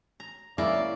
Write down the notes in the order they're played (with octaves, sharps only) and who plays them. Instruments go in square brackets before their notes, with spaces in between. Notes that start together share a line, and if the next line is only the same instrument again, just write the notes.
[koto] A#5
[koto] C#3 A#3 [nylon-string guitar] E4 [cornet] D5 [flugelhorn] E5